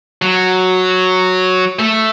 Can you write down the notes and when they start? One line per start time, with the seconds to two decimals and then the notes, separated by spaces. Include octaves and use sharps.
0.22 F#3
1.79 A3